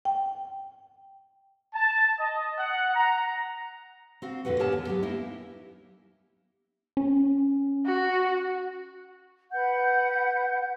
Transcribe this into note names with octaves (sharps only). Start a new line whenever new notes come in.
G5
A5
D#5
F#5
A#5
C4 F#4 F5
F2 A#2 D3 F#4 B4 F#5
B3 G4 A#4 C#5 G#5 A5
D#2
F#3 B3 G4
A#3 D#4 E4 G4
C#4
F#4
B4 F#5 G6